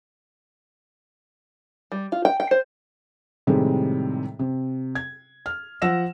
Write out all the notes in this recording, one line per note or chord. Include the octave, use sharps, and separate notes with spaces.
G3
F4
G5
G5
C5
A2 C3 D#3 G3 G#3
C3
G#6
F6
F3 F#5 E6 A#6 E7